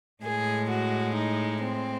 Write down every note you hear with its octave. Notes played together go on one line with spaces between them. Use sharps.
A2 G#3 G#4
F#4
D#4
C4